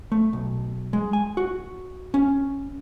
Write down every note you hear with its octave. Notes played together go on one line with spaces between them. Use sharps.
A3
B1
G#3
G#5
F#4
C#4